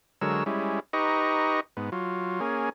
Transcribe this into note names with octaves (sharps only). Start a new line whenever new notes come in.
D3 F#3 G#3 A#4 C#5 E6
G3 G#3 C#4 E4
D#4 G4 B4 D#5 A#5 C#6
G#2 B3
F#3 F4
A#3 C#4 G#4